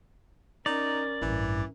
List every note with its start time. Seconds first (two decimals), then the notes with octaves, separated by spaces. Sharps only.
0.66 C#4 D#4 A#4 D5
1.22 A1 G2 E3